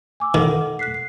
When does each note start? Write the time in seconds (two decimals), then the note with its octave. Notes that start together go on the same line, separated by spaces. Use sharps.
0.20 G#5 D6 E6
0.34 D#3 A4 F#5
0.79 F#6 B6 C7
0.94 C7